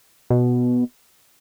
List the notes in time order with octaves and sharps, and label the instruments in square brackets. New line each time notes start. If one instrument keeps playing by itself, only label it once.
[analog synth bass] B2